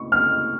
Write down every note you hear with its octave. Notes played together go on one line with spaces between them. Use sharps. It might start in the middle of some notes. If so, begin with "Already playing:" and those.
Already playing: C#6
F6